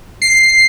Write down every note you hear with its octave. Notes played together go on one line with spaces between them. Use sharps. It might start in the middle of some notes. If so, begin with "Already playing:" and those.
C7